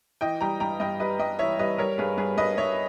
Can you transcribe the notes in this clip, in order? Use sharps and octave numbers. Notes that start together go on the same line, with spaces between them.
E3 D#5 G5
G3 G5 A#5
G2 G5 A#5
G2 D#5 G5
G3 B4 D#5
G2 D#5 G5
E3 C#5 E5
G3 B4 D#5
G3 A#4 C#5
G2 G#4 B4
G2 G#4 B4
G2 B4 D#5
G2 C#5 E5